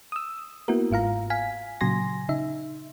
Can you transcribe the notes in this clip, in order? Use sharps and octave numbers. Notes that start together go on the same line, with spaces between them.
D#6 E6
A#3 B3 E4 F#4 A#4
G1 G#2 F4 F5 A#5
F5 G#5 B6
A#2 C#3 F#3 G#5 C6 A#6
C#3 D#4 E5